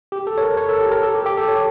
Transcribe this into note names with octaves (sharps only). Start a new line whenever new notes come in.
G4
A4
C#5
A#4
C#5
A4
G4
A#4
A4
G4
G4
A4
C#5